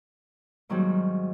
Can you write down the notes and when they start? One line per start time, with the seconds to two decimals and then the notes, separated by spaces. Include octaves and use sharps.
0.69 G#2 D#3 F#3 G3 A#3 C4